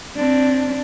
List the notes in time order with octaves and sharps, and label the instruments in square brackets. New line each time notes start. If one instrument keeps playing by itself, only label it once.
[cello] C4 D4